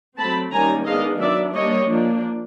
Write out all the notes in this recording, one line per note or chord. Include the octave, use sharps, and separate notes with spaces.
F#3 A3 C4 A5 B5
D#3 G3 A#3 C#4 G#5 A#5
D#3 G#3 B3 D4 D#5 F5
F#3 B3 D4 D5 E5
G3 A#3 D4 C#5 D#5
F3 A#3 D4